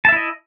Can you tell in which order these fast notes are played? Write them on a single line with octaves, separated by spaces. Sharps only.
A5 E5 E4 D#5